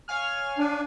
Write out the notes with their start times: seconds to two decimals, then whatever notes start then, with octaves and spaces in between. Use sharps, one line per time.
0.09 C#5 F5 G#5 F6
0.58 D4